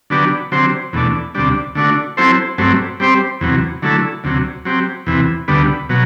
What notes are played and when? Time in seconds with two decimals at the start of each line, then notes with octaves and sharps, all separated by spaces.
0.10 D3 F#3 B3 D4 G4
0.52 D3 F#3 C4 G4 C5
0.93 E2 B2 A3 D4
1.35 D2 C3 G3 D4
1.75 D3 A3 D4 F#4
2.17 F#3 C4 E4 A4 C5
2.58 G2 F#3 A3 C4
3.00 G3 C4 G4 C5
3.41 E2 C3 F#3
3.82 D3 F#3 A3 E4 A4
4.24 D2 C3 F#3
4.65 F#3 C4 G4
5.07 E2 C3 E3
5.48 D2 D3 G3 B3
5.89 B2 F#3